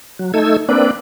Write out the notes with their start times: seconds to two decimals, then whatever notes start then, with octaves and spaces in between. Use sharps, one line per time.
0.19 F#3
0.34 A3 D#4 A4 E6 G#6
0.69 A#3 C4 D4 B4 D5